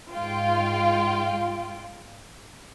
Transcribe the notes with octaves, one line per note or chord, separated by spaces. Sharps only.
G#2 F4 G5